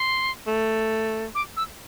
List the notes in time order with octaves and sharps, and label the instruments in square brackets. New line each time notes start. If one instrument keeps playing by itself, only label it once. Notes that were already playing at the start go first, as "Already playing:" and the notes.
Already playing: [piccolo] C6
[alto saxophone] A3
[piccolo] D6
E6